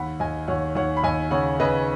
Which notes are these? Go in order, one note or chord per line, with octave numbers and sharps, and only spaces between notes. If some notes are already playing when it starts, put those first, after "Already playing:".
Already playing: D#2 F#5 B5
D#2 D#5 G#5
D#2 C#5 F#5
D#2 C#5 F#5
B5
D#2 D#5 G#5
C#3 C#5 F#5
C#3 B4 D#5